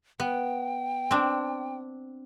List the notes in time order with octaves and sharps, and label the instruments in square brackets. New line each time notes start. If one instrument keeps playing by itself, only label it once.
[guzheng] B3 [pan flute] G5
[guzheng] C4 D4